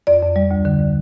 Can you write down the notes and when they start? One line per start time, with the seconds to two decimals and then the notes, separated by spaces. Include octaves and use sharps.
0.07 F2 D5
0.22 F2
0.36 G3
0.51 D2
0.65 D3